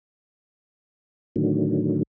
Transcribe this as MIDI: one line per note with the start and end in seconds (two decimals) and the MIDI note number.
1.36 2.03 45
1.36 2.03 50
1.36 2.03 51
1.36 2.03 54